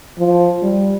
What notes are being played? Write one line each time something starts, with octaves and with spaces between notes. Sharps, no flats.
F3
G3